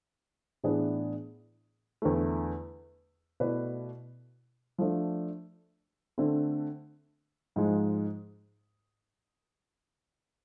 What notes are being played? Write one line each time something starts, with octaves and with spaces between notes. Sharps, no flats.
A2 E3 B3 D4 G#4
E2 D3 A3
B2 A3 E4 B4 D5
F3 A3 D4
D3 A3 C4
G#2 F3 G#3